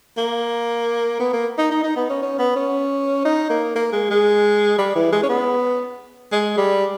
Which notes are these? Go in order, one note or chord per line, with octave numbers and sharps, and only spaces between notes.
A#3
B3
A#3
D#4
D#4
D#4
B3
C#4
C#4
B3
C#4
D#4
A#3
A#3
G#3
G#3
G3
E3
G#3
C#4
B3
G#3
G3